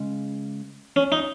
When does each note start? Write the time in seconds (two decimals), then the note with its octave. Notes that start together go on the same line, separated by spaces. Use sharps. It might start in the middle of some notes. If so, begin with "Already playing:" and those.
Already playing: C#3 G#3 C#4
0.96 C#4
1.12 D#4